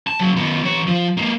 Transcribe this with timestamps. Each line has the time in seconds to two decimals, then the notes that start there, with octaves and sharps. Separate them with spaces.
0.07 A5
0.19 C#3 F#3
0.37 D#3 B3
0.63 E3 C#5
0.87 F3
1.17 G#3 A#3